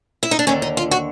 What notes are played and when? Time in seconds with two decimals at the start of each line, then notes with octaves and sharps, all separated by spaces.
0.23 E4
0.31 D#4
0.39 D4
0.47 D#2 D3 C#4
0.62 D#4
0.77 F4
0.91 F#4